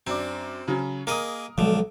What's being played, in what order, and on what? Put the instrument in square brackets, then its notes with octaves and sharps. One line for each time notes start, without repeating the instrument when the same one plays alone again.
[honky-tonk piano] F#2 D4 D6 [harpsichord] C4
[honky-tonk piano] C#3 F#3 C#4
[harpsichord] A#3 G#4 D#5 [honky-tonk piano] A#4 D#6
[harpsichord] B1 D3 [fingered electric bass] F3 G#3